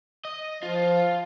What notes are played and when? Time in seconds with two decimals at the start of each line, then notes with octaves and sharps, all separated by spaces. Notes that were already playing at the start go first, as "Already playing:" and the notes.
0.25 D#5
0.63 F3 F4